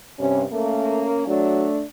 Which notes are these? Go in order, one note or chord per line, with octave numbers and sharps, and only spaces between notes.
G2 C3 C#4
A3 A#3 C#4
F#3 A3 D4